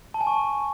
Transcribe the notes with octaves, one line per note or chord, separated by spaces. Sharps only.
A5
G#5
C#6